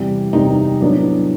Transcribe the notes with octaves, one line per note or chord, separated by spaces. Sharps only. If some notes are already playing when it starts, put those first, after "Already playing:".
Already playing: E2 C3 E3 G3
E2 C3 E3 G3 D#4
A2 F#3 B3 D4